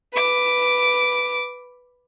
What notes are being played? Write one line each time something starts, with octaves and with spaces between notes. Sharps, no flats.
B4 D6